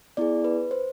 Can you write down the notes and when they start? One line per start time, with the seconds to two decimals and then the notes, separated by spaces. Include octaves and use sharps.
0.17 B3 E4 G#4 D5
0.44 B4
0.71 C5